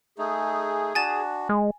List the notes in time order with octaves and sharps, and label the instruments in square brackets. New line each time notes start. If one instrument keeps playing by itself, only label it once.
[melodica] A3 D#4 [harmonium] G#4
[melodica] D4 F#4 [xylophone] G#5 A6 E7
[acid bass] G#3